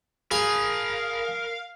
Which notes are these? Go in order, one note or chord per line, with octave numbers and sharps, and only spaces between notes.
G#4 A#4 F5 B5